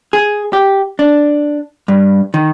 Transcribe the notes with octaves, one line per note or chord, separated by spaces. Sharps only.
G#4
G4
D4
G2
D#3